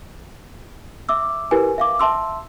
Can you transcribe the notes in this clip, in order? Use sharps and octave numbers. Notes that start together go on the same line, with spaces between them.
E5 D6 E6
E4 G4 A#4 B4 G#5
E5 F5 D6
E5 A5 C6 E6